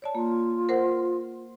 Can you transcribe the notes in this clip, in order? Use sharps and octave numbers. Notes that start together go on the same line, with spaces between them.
C#5 D5 A5
A#3 F4
A#4 C5 F#5